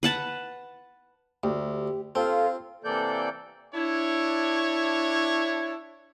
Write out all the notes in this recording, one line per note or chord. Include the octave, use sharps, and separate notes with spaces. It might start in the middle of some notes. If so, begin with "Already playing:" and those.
B4 F#5 A5
D2 G4
C4 F4 A4
C3 E3 A#3 A4 D5 G6
D4 E4 C#5